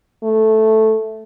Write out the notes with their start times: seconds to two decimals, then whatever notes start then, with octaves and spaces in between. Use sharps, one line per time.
0.23 A3